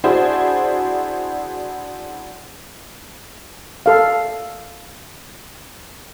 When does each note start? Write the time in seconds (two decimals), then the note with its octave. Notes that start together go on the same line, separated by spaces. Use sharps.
0.04 D4 E4 F#4 G#4 C5
3.86 A4 F5